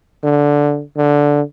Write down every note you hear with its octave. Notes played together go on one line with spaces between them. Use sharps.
D3
D3